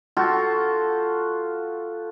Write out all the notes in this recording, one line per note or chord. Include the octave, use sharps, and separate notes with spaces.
F4 F#4 A4 G5